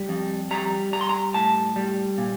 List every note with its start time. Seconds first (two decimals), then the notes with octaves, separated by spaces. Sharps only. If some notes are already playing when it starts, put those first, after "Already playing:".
Already playing: G3
0.09 F2
0.51 G3 A#5
0.93 G3 A#5
1.01 C6
1.09 A#5
1.34 A2 A5
1.76 G3
2.18 A#2